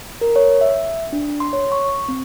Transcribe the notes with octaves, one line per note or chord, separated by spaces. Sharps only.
A#4
C#5
E5
D4
C6
C#5
C#6
C4